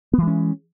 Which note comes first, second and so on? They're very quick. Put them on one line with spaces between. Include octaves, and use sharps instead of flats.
B3 E3 G#3 C#4